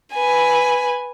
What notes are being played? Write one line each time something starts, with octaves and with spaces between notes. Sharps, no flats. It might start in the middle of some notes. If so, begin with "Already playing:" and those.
B4 G#5